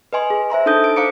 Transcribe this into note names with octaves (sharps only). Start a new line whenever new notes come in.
B4 D#5 G#5 C6
G#4
C5 E5 A#5 C6
D4 D#4 A4 A5 D#6 G6
D7
C5 F5 A#5 D6 C#7 D7